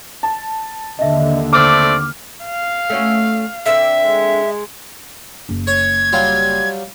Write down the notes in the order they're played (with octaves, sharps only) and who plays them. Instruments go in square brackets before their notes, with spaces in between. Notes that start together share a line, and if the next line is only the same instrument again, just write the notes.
[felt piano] A5
[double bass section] D#2 D3 [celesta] D#5 E5
[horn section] A3 C4 D5 [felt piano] D6 [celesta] F6
[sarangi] F5
[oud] A3 C#4 F#4
[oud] D3 C4 [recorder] E5
[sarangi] G#3
[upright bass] F#1
[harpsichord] C#5 [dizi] G#6
[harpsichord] F#3 G3 F4